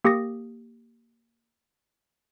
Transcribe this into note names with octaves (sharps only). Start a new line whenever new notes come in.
A#3 G4 D6 D#6 A#6